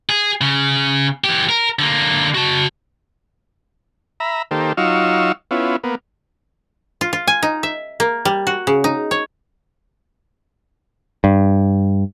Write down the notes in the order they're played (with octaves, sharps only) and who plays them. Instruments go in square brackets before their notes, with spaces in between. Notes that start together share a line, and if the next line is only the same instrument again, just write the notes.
[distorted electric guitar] G#4
C#3
E3 G4
A#4
D3 A#3
F#4 A5
[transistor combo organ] E5 A#5 B5
D#3 A#3 G4 A4 C5
F#3 D#4 F4 F5 C#6 E6
B3 C#4 E4 F4
A#3 B3
[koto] F4
F4
G#5
D#4
E5
A#3
G3
F#4
C#3
D#4
C#5
[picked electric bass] G2